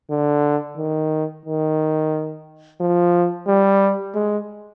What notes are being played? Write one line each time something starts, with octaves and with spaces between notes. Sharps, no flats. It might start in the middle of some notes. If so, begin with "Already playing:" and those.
D3
D#3
D#3
F3
G3
G#3